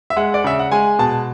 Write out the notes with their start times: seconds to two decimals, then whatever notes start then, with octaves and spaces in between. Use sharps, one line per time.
0.10 E5
0.16 G#3 F#5
0.34 D5
0.44 C#3 E5
0.59 F#5
0.72 G#3 G#5
0.99 B2 A5